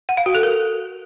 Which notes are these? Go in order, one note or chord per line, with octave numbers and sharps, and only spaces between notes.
F#5
F5
F#4
A4
A#4